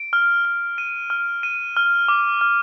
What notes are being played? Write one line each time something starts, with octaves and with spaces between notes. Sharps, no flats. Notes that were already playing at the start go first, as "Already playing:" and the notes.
Already playing: D7
F6
F6
D#7
F6
D#7
F6
D6
F6